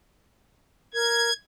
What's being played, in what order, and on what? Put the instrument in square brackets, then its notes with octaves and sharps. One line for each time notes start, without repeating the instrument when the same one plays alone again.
[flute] A#4 [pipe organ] G#6